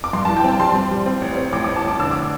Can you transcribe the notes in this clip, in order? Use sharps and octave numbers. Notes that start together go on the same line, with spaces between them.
D6
G2 C6
A5
E3
G5
C4 A5
G3 C6
C4
G3
C4
A1
C4
A1 D6
D6
A2
A5
A1 D6
D3 E6
D6